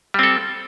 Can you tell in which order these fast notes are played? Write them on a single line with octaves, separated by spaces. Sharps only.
G3 C4 A4